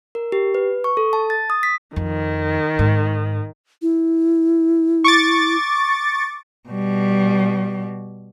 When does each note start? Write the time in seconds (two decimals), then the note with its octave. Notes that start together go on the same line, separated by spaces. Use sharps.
0.15 A#4
0.32 G4
0.55 B4
0.84 C#6
0.97 A4
1.13 A5
1.30 A6
1.50 D#6
1.63 B6
1.96 F2 D#3
2.79 G#2
3.82 E4
5.04 C#6 D6 A6
6.69 B2 G3